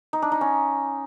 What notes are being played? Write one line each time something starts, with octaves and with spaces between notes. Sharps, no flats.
D#4
D4
D#4
C#4